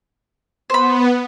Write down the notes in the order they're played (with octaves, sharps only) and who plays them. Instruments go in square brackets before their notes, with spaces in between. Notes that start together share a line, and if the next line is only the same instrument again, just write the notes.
[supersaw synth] B3 [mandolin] C5 B5